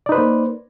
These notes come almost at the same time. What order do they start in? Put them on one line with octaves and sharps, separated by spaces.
D5 D#4 B4 C5 A#3